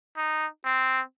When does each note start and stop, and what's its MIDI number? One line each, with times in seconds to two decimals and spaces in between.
0.17 0.46 63
0.65 1.01 60